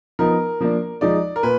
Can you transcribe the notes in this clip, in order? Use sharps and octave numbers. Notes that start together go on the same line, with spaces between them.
F3 B3 D#4 A#4
F3 A#3 D4
F3 G#3 D#4 D5
A#4
A#2 B4